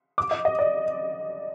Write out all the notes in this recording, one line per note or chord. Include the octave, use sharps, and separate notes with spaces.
D6
D#5
D#5
D5